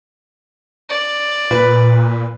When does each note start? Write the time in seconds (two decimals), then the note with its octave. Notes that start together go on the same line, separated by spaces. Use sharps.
0.90 D5
1.51 A#2 B4